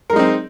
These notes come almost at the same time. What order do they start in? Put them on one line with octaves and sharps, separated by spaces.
A#4 G#3 D#4 C4